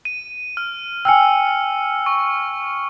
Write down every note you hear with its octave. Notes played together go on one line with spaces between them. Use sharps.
D#7
F6
G5 G#5 E6 F6 C#7
C#6